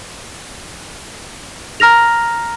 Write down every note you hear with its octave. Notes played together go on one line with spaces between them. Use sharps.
A#5 F6 A#6 F7